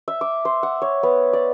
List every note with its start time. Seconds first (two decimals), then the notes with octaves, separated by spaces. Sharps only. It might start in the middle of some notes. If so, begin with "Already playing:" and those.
0.08 E5
0.21 D6
0.45 C5
0.63 F#5
0.82 C#5
1.03 B3
1.33 D5